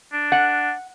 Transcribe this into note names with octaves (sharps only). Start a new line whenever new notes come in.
D4
F#5